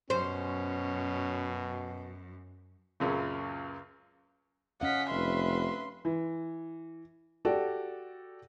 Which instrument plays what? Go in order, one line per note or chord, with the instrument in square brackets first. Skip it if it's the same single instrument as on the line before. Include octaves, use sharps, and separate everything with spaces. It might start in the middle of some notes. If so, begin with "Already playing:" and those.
[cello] F#2 [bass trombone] B2 [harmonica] C#4 [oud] C5
[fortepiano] C#2 F#2 A#2 C#3
[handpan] C#4 F5 [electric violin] D#5 B6 [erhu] F#5
[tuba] F1 [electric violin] B4 E5 [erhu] C6
[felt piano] E3
F#4 G4 A4 D5